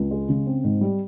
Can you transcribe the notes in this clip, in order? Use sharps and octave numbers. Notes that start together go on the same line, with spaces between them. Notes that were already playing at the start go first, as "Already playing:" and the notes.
Already playing: C#2
G#3
C#3
C4
G#2
G3